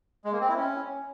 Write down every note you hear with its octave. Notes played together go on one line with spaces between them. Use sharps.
G#3
A#3
C4
E4
C#4